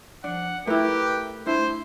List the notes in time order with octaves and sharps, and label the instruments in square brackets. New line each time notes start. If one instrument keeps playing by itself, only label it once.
[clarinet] F3 [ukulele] D4 [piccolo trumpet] F#5
[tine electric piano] A3 [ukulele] E4 A#4 [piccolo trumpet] G4 [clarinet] B4
[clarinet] D4 [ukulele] E4 [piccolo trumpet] C5